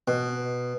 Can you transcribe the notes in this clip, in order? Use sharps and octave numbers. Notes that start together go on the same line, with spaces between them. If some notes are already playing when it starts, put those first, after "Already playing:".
B2